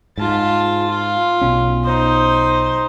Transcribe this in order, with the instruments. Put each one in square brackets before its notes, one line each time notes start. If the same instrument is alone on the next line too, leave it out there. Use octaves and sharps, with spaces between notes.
[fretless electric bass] G#2 [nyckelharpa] F4 A5
[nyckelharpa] F4
[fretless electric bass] B1 B2 C#4
[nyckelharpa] D#4 C5